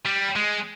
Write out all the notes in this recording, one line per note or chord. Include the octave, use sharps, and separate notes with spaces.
G3
G#3